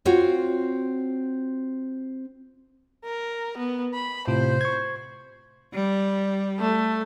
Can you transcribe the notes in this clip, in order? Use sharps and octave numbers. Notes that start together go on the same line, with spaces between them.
C4 F4 F#4 C#5
A#4
B3
B5
A2 C3 F4 C5
C#6 G#6
G3
A3